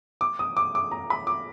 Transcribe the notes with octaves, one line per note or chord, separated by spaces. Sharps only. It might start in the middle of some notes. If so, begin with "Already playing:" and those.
D6
D#6
D6
D6
A#5
B5
D6